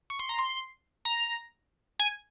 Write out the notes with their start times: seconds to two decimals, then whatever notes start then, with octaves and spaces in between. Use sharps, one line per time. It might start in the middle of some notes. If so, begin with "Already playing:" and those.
0.10 C#6
0.19 C6
0.29 A#5
0.39 C6
1.05 A#5
2.00 G#5